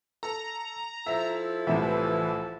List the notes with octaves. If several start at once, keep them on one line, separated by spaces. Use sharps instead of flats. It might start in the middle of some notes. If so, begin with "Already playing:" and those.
A4 A#5
F3 E4 A4 E5
C2 A2 E3 E5